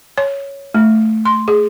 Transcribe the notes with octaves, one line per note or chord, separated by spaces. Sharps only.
C#5
A3
C6
G#4